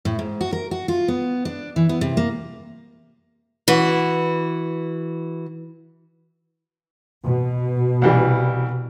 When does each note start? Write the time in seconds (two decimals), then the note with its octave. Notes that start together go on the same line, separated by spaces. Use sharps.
0.05 A2
0.19 G#2
0.41 F#4
0.53 A#4
0.71 F#4
0.88 F4
1.08 B3
1.45 D4
1.76 E3
1.89 B3
2.01 C3
2.17 A#3
3.68 E3 F#4
7.23 B2
8.02 C2 E3 G3